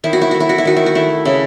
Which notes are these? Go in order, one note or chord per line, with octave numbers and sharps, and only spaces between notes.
D#3 E4
F#4
E4
A3 F#4
E4
F#4
E4
D#3 F#4
E4
F#4
A3 E4
C#3 E4